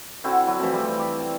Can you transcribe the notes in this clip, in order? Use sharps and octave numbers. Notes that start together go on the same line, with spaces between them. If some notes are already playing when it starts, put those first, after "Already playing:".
D3 C4 E4 F#4
F#3 E4
E3 F3 A3 C4
G3
D5 E5
A5